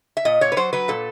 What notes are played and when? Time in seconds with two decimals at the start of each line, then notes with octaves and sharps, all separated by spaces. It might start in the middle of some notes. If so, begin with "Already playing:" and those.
0.17 E5
0.25 A#2 D#5
0.41 A#2 C#5
0.52 B4
0.57 F#3 C5
0.73 F#3 B4
0.88 A#2 A4